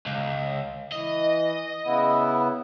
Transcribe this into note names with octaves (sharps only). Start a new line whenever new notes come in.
C#2
E3 D#5
C#3 B3 E4